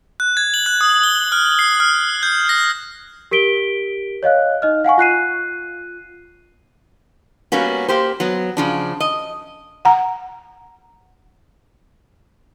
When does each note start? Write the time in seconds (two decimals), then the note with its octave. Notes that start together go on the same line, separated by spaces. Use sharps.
0.20 F#6
0.37 G#6
0.54 F#7
0.66 F#6
0.81 D#6
1.03 G7
1.32 F6
1.59 C7
1.80 F6
2.23 G6
2.49 A#6
3.31 G4 A#4 B6 D7 G7
4.23 C#5 D#5 F5 F#6
4.62 D#4 D#5 F6
4.84 F5 F#5 G#5 C#6
4.98 F4 F#6 C7 D#7
7.52 G3 A#3 B3 C#4 F#4
7.88 A#3 G4 C5
8.20 F#3 B3
8.57 C#3 F3 D4
9.00 D#5
9.85 F#5 A#5